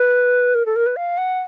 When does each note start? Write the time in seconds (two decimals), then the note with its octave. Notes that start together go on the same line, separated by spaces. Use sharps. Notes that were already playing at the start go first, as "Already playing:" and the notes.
Already playing: B4
0.55 A#4
0.66 A4
0.76 A#4
0.86 B4
0.96 F5
1.18 F#5